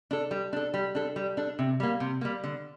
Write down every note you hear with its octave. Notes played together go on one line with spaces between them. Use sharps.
D4 A4
G3
D4 A4
G3
D4 A4
G3
D4 A4
C3
G3 A#3
C3
G3 A#3
D3